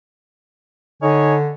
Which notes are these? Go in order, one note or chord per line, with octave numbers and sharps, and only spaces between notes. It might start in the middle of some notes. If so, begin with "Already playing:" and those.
D3 D#4 C#5 G#5